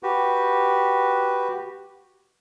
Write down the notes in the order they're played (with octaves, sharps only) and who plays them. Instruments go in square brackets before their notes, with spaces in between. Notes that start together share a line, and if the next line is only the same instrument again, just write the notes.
[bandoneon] F#4 G4 B4